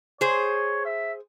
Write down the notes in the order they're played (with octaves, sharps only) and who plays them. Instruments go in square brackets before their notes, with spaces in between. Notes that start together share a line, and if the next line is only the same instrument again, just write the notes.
[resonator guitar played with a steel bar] G#4 C5 [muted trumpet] C#5
[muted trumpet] E5